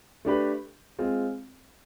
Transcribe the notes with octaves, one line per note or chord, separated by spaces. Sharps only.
A3 D4 G4 B4
G#3 C4 F4